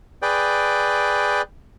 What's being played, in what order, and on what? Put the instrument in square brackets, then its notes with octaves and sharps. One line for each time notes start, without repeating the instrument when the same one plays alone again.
[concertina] G#4 B4 D5 G5